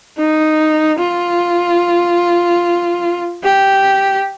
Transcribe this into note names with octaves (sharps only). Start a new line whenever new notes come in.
D#4
F4
G4